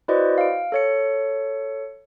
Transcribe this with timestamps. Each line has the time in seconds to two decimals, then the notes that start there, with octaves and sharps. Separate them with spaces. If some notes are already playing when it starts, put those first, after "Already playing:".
0.08 E4 F#4 B4 C5 D5 D#5
0.38 F5 D7
0.72 A4 C#5 C#7